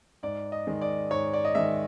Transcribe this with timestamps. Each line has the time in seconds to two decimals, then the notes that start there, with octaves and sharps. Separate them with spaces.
0.23 G#2 D5
0.52 D#5
0.67 D#3 G#3
0.81 D5
1.11 G#2 C#5
1.34 D5
1.45 D#5
1.55 D#3 G#3 E5